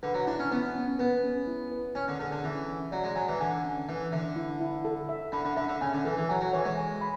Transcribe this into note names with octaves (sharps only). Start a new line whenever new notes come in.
D3 B4
F#3
D4 E4
C#4
B3 B4
C#4
B3 B4
C#4
E4
B4
C#4 G#5
D3
D3 G#4
D3
E3 C#4
C#4
F#3 D5
G#3
F#3 G#5
E3
D3 G#5
C#4
E3 E5
D3 E5
E4
E4
A4
E5
D3 B5
D3
D3 E5
D3
C#3 G#5
D3
E3 A4
E3
F#3 G#5
F#3
E3 C#5
G#3
G#5
B5